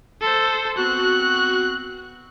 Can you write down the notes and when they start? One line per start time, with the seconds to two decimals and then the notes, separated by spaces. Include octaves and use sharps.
0.21 A4 C5
0.77 B3 C4 F#4 F#6